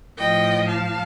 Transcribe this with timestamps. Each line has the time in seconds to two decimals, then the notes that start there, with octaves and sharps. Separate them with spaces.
0.17 A2 F3 D#5 G5
0.68 F5 A5